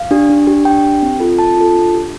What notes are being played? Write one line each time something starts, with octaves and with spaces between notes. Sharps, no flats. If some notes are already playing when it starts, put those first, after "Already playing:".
Already playing: F5
D4 G4
D4
G4
D4 G5
G4
C4
F4 A4
C4 A5
F4 A4
D4
G4